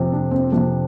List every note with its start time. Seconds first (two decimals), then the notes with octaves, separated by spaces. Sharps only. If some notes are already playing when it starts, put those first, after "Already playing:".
Already playing: F2 C3
0.12 D4
0.31 C4
0.52 F2 C3 D4